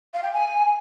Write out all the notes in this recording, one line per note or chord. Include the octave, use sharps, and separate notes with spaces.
F5
G5
G#5